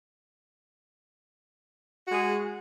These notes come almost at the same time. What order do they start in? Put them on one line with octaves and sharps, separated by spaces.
F#4 G#3 G#4